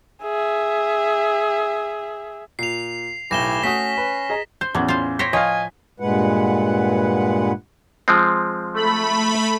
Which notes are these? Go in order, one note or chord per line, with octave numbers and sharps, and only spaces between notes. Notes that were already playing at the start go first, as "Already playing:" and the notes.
G#4 E5
A#2 C7 F7
B1 A2 E4 G4 G#5 A#6 E7 G7
A3 C#4 F#4 D#6 B6
B4
G#4 D#5 A#5
C5 G6
E2 A2 F#3 C#4
F4 C5
C5 C#5 G5 A#6 B6
F3 C#5 D#5 F5 G#5
G2 A#2 G#3 B4 F#5
F3 G#3 C4
A3 B5